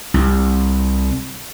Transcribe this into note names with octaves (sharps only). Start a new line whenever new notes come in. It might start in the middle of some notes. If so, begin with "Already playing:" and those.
C2